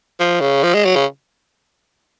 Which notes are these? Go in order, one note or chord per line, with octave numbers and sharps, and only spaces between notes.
F3
C#3
F3
G#3
F#3
C#3